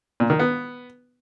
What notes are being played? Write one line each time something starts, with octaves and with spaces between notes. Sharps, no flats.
A#2
D#3
B3